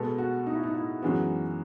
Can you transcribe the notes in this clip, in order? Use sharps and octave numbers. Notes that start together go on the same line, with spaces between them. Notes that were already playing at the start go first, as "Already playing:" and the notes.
Already playing: B2 G#3 B3 A4
F#4
D#4
E4
D#4
E4
F#2 E3 G#3 B3 F#4